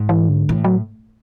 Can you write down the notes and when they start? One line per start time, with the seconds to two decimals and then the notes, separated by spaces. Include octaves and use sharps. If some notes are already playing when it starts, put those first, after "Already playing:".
Already playing: G#2
0.09 E3
0.29 D3
0.49 A2 E3
0.64 F#3